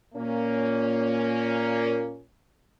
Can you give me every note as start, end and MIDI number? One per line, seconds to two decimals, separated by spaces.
0.15 2.21 46
0.15 2.21 58
0.15 2.21 61